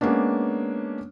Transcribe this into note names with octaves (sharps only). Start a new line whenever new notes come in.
G#3 A#3 B3 C#4 D4